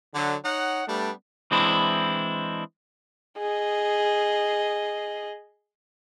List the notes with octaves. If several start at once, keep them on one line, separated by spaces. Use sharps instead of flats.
D3 F#3
D#4 C#5 F#5
G3 A3 B3 D4
E3 G#3 C4 D4 E4
G#4 D#5